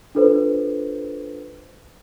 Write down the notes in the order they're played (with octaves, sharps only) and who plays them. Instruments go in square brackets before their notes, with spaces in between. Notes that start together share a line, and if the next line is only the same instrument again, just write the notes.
[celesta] D4 F4 A4 B4 C5